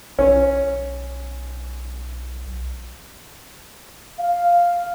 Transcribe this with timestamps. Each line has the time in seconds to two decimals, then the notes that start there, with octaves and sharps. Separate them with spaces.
0.19 B1 C#4
4.19 F5